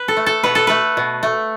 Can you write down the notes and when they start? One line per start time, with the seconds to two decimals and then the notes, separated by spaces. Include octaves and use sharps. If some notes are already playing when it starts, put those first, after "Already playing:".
Already playing: B4
0.08 A4
0.17 A3
0.26 A4
0.43 B2 B4
0.55 A4
0.67 A3 B4
0.97 B2
1.23 A3